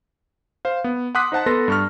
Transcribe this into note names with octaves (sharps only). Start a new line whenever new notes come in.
C5 F5
B3
F#5 C6 D6 D#6 F#6 B6
D#4 C5 F#5 A5
B3 A4 B4 C6 A#6
G2 C#6 F6